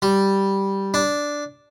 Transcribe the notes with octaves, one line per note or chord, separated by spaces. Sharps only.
G3
D4